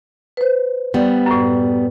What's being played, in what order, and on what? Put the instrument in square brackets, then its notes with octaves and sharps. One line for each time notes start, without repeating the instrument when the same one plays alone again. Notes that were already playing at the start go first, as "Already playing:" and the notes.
[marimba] B4 C5
[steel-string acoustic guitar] G3 B3 [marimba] D5
[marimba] F#2 A2